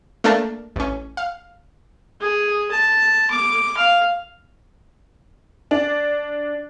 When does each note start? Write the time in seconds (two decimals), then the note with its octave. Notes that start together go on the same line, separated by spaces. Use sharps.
0.24 A3 A#3 D4 A#4 A5
0.76 A1 C#4
1.17 F5
2.21 G#4
2.71 A5
3.30 D6
3.77 F5
5.71 D4